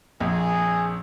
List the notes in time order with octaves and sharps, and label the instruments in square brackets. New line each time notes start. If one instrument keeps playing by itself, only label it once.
[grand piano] A#1 F2 [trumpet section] G#4